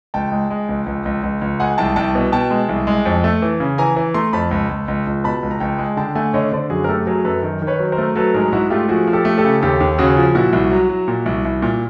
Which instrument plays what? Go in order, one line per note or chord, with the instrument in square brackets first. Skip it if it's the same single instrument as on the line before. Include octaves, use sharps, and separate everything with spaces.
[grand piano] C#2 G5 A5
G#3
G#3
C#2
C#2
C#2
C#2
C#2
G#3 F#5 G#5
C2 G5 A5
C2 G5 A5
B2
B2 G5 A5
G#3
C2
G#3
F2
A3
E3
C#3
E3 G#5 A#5
E3
A3 A#5 C6
F2 A5 B5
C#2
C#2
C#2
C#2
B2 A5 B5
C#2
A#5
C#2 G5 A5
G#3
D3 G5 A5
A3 F#5 G#5
D3 C#5 D#5
D3 C5 D5
F#2 F#4 G#4
A#4
A3 G4 A4
F#3 G#4 A#4
F#2 A4 B4
D#3
D#3
B4 C#5
F#3
A#4 C5
A3
F#3 A4 B4
G#2 G#4 A#4
G#2 E4 F#4
A3 F4 G4
F3 F#4 G#4
F3
G4 A4
A3
G4 A4
C#3
D#2 G4 A4
D#2
C#3 F#4 G#4
F3
A#2 E4 F#4
C2
F#3
F#3
A#2
C2
C2
A#2